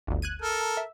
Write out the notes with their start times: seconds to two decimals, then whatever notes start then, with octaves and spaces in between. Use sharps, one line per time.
0.07 G1 D2
0.22 F#6 G#6 D#7
0.42 A4 A#4
0.77 E5